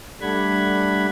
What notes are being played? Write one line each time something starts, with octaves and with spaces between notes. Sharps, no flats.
G3 A3 D4 F#5 B5 G#6